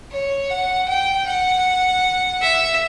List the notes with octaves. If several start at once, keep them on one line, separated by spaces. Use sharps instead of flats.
C#5
F#5
G5
F#5
E5